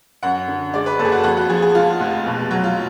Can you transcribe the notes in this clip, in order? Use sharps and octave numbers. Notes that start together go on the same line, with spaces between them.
F#2 F#5
D3
G#3 D5
B4
F#1 A4
G#4
F#4
F2 F#4
F#4
F3 G#4
G#4
G#3 F4
F1
B2
F#3
F4